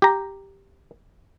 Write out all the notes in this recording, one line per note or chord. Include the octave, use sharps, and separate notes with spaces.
G4 A#5